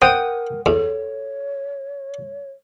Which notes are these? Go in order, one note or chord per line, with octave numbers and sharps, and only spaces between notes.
C4 A#4 F#5 G5 D#6
E2 A4 C#5